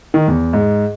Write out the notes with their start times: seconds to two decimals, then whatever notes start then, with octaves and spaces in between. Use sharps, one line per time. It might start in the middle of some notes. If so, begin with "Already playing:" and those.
0.14 D#3
0.28 E2
0.53 G#2